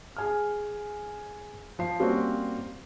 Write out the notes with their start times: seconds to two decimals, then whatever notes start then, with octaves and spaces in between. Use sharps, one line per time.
0.17 G#4 G#5 F6
1.79 F3 C7
2.00 G3 A#3 C4 C#4 F#4